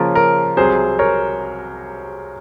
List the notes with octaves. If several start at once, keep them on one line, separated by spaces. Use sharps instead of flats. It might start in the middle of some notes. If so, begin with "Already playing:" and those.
Already playing: C#3 F3 A#3 C#4 F4 A#4
A#4
C2 C3 F#3 G#4 C5
A#4 C#5